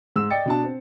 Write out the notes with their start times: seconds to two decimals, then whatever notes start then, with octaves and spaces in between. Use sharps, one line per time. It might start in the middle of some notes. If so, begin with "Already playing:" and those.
0.16 G#2 E6 E7
0.30 D5 D#5 G5 A6 C#7
0.46 B2 D4 A5
0.64 C4